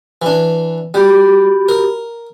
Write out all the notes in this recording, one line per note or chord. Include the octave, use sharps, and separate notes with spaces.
E3 D4
G3 F#4 G4 B5
A#4